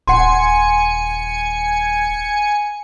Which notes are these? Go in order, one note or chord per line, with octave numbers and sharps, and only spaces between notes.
D#1 F#5 G#5 C6 C#7